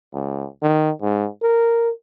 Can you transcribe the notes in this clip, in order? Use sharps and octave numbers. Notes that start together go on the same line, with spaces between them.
C#2
D#3
G#2
A#4